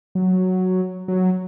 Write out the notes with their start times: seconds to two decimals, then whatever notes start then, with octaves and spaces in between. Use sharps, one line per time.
0.15 F#3
1.08 F#3